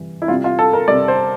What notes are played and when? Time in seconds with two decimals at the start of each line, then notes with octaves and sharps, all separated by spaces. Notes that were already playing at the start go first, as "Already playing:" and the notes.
Already playing: C3 E3 G3
0.22 E4
0.28 C3 G3 F4
0.44 F4
0.59 A4
0.73 A#4
0.88 C3 G3 D5
1.08 C5